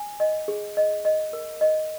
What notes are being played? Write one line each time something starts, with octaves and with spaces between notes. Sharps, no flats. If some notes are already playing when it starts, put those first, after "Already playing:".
Already playing: G#5
D#5
G#4
D#5
D#5
A#4
D#5